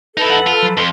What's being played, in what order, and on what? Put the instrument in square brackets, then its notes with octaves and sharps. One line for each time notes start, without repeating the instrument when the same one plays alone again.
[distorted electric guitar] D#4 E4 [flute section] A4 B4
[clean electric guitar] F2 F#5
[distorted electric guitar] F4
[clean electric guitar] F3 F#3
[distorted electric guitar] F2 [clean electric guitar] F3 C6